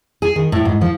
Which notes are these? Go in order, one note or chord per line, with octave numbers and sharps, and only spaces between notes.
G#4
D#3
A2
G#2
F3